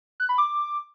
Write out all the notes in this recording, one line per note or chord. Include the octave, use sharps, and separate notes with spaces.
F#6
B5
D6